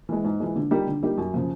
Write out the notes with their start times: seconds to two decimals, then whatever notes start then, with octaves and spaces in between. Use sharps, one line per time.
0.09 E3 G#3
0.24 G#2
0.40 E3 G#3
0.56 D3
0.71 G3 A#3 D#4 G4
0.87 D3
1.03 G3 A#3 D#4 G4
1.18 F#2
1.34 C#3 F3